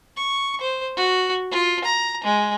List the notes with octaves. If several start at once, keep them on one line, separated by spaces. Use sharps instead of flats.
C#6
C5
F#4
F4
A#5
G#3